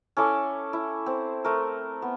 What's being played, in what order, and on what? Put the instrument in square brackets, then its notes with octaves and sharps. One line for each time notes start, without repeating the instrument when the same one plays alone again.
[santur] C#4 E4 A4 D6
E4
C4
A3 A#4
B3